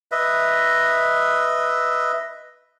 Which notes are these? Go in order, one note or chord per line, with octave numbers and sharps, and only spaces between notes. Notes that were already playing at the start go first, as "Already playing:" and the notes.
B4 D#5 E5